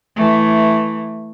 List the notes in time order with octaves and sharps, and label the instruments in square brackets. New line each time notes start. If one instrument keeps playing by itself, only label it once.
[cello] E3 A3